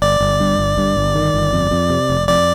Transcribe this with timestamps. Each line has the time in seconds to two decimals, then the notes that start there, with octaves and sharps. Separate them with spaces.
0.02 G1 D5
0.20 G1
0.40 G2
0.59 G1
0.78 G2
0.97 G1
1.15 D#3
1.34 G1
1.53 F2
1.71 F2
1.90 C3
2.10 F1
2.28 F2 D5